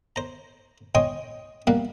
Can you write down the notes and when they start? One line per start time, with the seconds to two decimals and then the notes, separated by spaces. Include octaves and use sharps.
0.16 C5 A#5
0.95 C#5 D#5 G5 G#5 C6 D#6
1.67 G3 A#3 F5 F#5